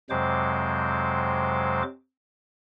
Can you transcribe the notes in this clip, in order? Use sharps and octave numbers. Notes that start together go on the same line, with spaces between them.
F2 C3 F#3 G#3 C5 D6